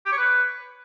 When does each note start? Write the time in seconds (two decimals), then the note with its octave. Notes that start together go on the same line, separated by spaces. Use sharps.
0.06 G4
0.12 C#5
0.18 B4